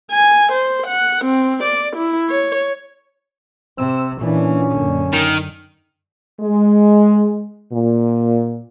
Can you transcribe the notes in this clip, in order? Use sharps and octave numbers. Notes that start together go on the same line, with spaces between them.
G#5
C5
F#5
C4
D5
E4
C#5
C3 C4 E6
A#2 E3 C#4 D4
F#2 D3
D#3
G#3
A#2